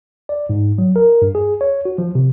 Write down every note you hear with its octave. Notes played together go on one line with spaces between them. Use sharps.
D5
G#2
F#3
A#4
G2
G#4
C#5
F#4
F3
C3